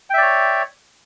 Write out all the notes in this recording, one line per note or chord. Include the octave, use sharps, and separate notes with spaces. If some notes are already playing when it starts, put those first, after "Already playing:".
C#5 D5 E5 G5